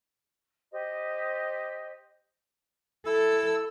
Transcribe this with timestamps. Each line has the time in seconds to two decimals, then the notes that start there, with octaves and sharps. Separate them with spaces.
0.72 G4 C5 D#5
3.06 E4 A4 E6